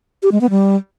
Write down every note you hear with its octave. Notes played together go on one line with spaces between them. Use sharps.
G4
G#3
B3
G3